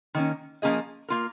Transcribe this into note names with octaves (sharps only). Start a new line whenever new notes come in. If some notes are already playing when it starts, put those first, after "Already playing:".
D#3 A#3 C#4
F3 A#3 C#4 G#4 D#5
A#3 F4 A#4